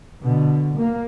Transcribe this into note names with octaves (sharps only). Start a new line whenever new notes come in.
B2 D3
A#3